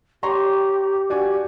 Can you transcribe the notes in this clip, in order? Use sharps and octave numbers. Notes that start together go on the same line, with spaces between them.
G4 C#5 A#5 C6
D4 F#4 G4 G#5